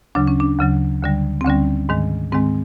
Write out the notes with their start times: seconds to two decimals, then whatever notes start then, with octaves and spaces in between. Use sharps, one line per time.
0.15 D2 C#3 F#3 D4
0.27 C#4
0.40 D4
0.59 D2 C#3 F#3
1.02 D2 D3 G3
1.41 C4
1.45 D2 D3 G3 C#4
1.89 G#2 D#3 G#3
2.32 G#2 D#3 G#3 C4